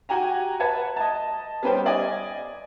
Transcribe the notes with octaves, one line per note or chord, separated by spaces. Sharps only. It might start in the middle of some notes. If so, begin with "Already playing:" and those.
F#4 G4 G#5 A#5
B4 F#5 A5 G#6
D#5 A5
G3 B3 C#4 B4 C5 G5
D5 D#5 G#5